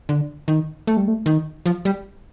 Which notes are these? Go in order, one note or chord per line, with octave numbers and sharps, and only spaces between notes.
D3
D#3
A3
G3
A3
D#3
F3
G3